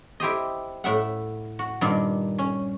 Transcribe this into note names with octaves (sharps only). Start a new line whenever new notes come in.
E4 G4 C5 D#5
A2 E5 F#5
F#4
G2 A#2 D#3
C#4